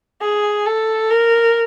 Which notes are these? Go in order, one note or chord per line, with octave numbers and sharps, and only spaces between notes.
G#4
A4
A#4